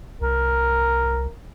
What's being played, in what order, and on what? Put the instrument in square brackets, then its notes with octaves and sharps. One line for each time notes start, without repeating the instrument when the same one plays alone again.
[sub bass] C2 [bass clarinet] A#4